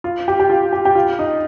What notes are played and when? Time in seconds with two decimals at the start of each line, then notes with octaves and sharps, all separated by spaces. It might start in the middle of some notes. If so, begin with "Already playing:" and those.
0.04 F4
0.28 G4
0.40 G4
0.50 F4
0.73 G4
0.85 G4
0.95 F4
1.19 D#4